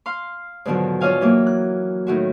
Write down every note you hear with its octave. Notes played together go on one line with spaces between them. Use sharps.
F5 C6
G#2 B2 D3 D#3 F3 F#3
D4 F4 C#5 D#5 F5 G#5
E3 F#3 A#3
F#6
A2 D#3 F#4